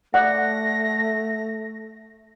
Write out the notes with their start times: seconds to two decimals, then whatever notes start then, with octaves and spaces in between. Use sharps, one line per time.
0.14 A3 D5 F#5 A#6